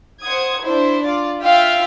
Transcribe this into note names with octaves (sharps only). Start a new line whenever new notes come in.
C5 F#5 D#6 G#6
D4 E4 C5
F4 D5
F4 E5 F5 G5